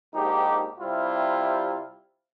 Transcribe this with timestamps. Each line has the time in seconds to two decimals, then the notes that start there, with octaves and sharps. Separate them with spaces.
0.15 A#1 G#2 D#4 G4
0.80 C3 G3 C4 E4 F4